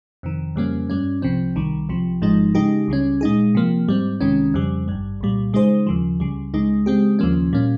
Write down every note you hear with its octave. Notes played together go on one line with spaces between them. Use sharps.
F2 C3 D#3
F2 C#3 G3 A#3 C#4
G2 G3 C#4
C2 C3 F3 C4
C2 C3 D#3 G3
C2 C3 F3
G#1 G#2 F3 G#3 D#4
C#3 G#3 D#4 G4
C#2 C#3 G3 C#4
A#2 G#3 D#4 G#4
C3 F3 A#3
G#2 G3 C4
C2 C3 D#3 G#3 C#4
F2 C#3 G3
G#1 G2 G3
C2 A#2 G3
C#3 G#3 D#4 G#4 C5
D#2 C#3 F3
C#2 C#3 G3
C#2 C#3 G#3 D#4
C#3 G#3 C4 G4
D#2 C#3 F3 A#3 C#4
A#2 G3 A#3 C#4